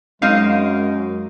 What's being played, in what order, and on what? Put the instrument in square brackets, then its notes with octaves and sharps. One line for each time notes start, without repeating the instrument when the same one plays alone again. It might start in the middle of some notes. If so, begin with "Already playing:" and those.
[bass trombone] F#2 [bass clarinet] G#3 [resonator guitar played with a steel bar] C4 D#4 A#4 [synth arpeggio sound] F5